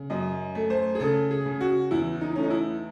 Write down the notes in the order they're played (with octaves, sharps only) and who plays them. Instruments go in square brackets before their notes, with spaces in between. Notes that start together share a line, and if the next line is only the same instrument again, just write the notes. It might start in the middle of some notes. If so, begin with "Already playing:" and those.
Already playing: [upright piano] C#3
F#2 D#5
A3
C5
G#4
C#3 A4
G#4
C#3
F#4
E2 E4
D#4
A3 C#4
D#4
E4